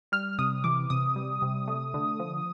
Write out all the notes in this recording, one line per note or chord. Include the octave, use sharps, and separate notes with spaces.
G3 F6
C3 D#6
E3 D6
C3 D#6
G3
C3
A3
D3
F3